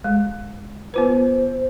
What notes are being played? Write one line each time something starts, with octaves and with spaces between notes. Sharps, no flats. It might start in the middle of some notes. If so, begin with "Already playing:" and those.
G#3
B3 F4 B4 C5